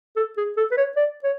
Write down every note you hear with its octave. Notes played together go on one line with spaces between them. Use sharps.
A4
G#4
A4
B4
C#5
D5
C#5